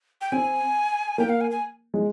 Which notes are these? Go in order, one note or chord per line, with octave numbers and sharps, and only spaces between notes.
G5
C4 G#5
A#3 G5
F5
G#5
G#5
G#3